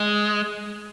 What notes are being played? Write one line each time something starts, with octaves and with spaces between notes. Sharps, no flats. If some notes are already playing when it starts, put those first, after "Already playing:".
Already playing: G#3